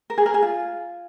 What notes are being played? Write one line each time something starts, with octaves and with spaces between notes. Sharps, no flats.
A#4
G#4
A#4
G#4
F4